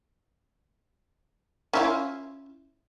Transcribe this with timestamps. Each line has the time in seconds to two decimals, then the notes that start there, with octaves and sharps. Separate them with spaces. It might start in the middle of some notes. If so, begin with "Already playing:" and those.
1.73 C#4 E4 F4